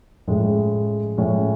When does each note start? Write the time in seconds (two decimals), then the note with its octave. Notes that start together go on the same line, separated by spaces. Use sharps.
0.27 A2 F3 G#3 C#4
1.17 A2 F3 G#3 C#4